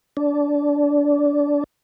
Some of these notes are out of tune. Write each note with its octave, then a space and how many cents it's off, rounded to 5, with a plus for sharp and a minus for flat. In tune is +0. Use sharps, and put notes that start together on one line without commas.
D4 -20